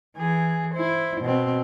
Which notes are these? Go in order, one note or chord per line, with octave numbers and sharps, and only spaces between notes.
E3 G#4
E4 C5
B2 C4